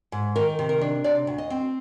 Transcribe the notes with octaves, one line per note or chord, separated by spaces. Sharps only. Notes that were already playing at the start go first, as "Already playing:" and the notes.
G#2
D#3 A#4
C3
A#4
D4
C3 D5
D2
D#5
C4